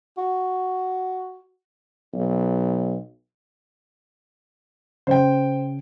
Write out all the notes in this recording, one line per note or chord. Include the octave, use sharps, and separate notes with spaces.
F#4
B1
C#3 C5 G5